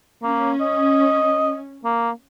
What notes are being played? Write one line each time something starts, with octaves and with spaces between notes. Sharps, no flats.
A#3 C#4
D#5
A#3